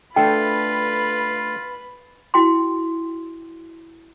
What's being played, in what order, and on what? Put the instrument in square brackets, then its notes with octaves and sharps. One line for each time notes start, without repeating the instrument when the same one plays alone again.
[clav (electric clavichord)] A3 D4 A4 [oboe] F4 [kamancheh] B4 B5 [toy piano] G5
[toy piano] E4 F#4 G5 C6